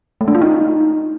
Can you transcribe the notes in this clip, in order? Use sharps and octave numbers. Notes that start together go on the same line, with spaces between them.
A3
D4
F4
D#4